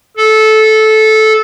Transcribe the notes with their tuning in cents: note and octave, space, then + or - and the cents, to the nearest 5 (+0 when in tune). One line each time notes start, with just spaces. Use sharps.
A4 -15